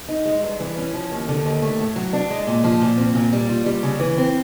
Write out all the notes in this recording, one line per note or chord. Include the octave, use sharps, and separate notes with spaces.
D#4
G#3
G2
E3
C#4
F3
D#2
D3
D#2
A3
A2
F#3
D4
G#3
A#2
F3
A#2
C4
A#2
G3
F4
G3
C#3
E3
C4